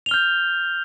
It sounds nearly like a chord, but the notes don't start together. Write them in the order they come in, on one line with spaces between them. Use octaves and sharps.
F7 G7 F6 G6